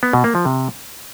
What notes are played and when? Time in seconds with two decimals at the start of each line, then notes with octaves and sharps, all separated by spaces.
0.03 B3
0.13 B2
0.24 A#3
0.35 F3
0.45 C3